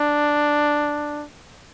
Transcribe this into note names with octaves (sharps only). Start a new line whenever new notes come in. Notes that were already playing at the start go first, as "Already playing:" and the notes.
Already playing: D4